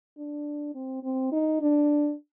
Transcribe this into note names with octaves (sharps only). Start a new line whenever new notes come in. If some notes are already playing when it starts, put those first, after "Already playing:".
D4
C4
C4
D#4
D4